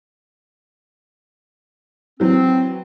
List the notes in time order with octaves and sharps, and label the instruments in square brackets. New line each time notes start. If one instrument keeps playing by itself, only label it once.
[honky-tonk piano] E3 F#3 [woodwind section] C4